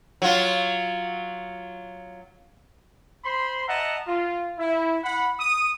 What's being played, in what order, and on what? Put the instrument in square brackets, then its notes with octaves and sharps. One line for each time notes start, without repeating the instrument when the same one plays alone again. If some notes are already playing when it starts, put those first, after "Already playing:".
[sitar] F#3 F4
[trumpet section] C5 B5 C6
D#5 E5 F#5 A5 A#5
F4
E4
F#5 B5
D#6